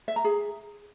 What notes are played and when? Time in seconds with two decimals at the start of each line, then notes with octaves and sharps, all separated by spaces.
0.08 E5
0.16 A#5
0.24 G#4